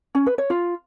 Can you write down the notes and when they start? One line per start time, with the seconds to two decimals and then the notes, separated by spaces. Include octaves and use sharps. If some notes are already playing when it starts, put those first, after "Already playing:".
0.15 C#4
0.26 B4
0.38 C#5
0.50 F4